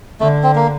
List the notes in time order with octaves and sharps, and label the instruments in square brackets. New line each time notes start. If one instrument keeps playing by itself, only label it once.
[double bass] D3 [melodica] A3
[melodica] C4
A#3